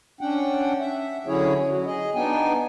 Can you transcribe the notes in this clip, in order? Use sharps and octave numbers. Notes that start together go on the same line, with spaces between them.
C#4 D4 F#5 G5
E5
D3 F#3 C#4 E4 G#4 C#5
F#3
G#4 D#5
B3 D4 D#4 G5 G#5